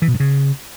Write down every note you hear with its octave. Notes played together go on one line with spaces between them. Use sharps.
E3
B2
G2
C#3